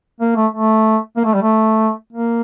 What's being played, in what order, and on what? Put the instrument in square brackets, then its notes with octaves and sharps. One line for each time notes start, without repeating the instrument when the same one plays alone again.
[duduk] A#3
A3
A3
A#3
A3
G3
A3
A#3